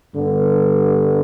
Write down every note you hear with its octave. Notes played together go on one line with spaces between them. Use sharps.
G2 D3 G3 B3